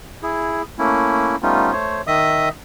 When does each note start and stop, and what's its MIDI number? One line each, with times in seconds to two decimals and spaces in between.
0.23 0.62 64
0.23 0.62 68
0.79 1.36 57
0.79 1.36 58
0.79 1.36 61
0.79 1.36 64
1.43 1.72 55
1.43 1.72 57
1.43 1.72 59
1.43 1.72 61
1.43 1.72 63
1.43 1.72 65
1.72 2.02 57
1.72 2.02 72
1.72 2.02 73
2.07 2.49 51
2.07 2.49 75
2.07 2.49 76
2.07 2.49 87